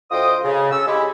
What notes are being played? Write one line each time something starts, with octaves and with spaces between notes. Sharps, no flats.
D2 F4 C5 D#5 G5 D#6
C#3
C#4 A4 E6
G#3 E4 G4